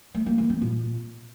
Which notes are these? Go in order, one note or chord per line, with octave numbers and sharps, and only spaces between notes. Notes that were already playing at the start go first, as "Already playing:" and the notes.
A3
A#3
E3
C4
A#2